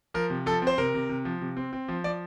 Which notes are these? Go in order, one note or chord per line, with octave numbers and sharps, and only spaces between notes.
F3 A#4
C3
F3 A4
C4
C5
C3 A#4
C3
C3
F3
C3
C4
C4
F3
F3 D5